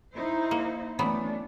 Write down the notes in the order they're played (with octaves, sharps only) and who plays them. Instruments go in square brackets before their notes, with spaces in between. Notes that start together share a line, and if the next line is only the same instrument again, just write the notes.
[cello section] D#4 E4 C5
[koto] A#3
[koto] E3 F#3 B3 [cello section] A3 C#4 D4